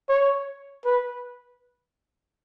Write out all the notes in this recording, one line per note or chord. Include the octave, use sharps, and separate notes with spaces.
C#5
B4